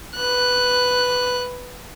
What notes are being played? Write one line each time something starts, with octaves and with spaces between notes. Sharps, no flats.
B4 F#6